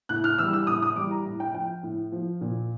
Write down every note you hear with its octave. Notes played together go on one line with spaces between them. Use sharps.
A2 F#6
F6
E3 G3 E6
E6
A2 D#6
D#6
E3 G3 D6
A#5
A2
G5
F3 G5
A2
F3
A#2